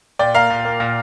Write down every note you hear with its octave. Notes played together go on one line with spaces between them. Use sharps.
A#2 D5 G5
A#3 F5 A#5
A#2
A#3
A#2